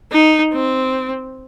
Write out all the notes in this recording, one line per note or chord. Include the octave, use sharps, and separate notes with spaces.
D#4
C4